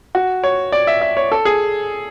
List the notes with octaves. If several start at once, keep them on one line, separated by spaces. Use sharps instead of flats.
F#4
C#5
D5
E5
E5
C#5
A4
G#4